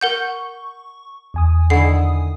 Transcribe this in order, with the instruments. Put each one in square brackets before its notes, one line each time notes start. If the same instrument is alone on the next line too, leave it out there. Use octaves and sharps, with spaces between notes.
[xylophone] A#4 F#5 G6 [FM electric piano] C#6
[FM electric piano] E2 G#5 D#6
[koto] D3 D#3 E4 [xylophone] C7